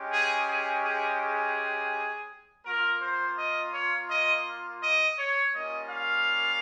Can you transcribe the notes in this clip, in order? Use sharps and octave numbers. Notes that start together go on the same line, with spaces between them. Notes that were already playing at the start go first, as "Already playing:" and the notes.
Already playing: G#3 C#4 G4
G#4
G#4
G#4
G#4
A#3 F4 A#4
C5
D#5
C#5
D#5
D#5
C#5
G3 A#3 C#4 F4 D#5
F5